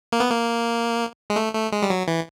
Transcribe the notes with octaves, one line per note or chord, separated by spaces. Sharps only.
A#3
B3
A#3
G#3
A3
A3
G#3
G3
F#3
E3